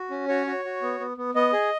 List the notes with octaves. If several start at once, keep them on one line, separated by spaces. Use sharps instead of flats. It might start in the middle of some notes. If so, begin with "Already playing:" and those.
Already playing: F#4
C#4
F#4 C#5
F#4
F#4
B3
B3
B3
B3 D#5
G#4